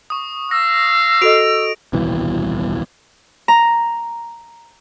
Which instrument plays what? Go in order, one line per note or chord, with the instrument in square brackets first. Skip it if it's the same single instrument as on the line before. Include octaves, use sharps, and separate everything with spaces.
[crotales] C#6 D#6
[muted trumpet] F5 [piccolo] E6 [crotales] A#6
[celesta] F#4 A4 D#5 [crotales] D7 F7
[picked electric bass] D#1 C2 B2 E3
[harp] A#5